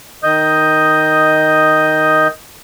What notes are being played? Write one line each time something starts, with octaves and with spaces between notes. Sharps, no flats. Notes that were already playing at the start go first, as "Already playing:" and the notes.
D#3 D#5 D#6 G6